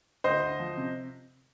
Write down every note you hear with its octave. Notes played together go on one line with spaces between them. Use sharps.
D2 C5 D#5
D2
F3
C3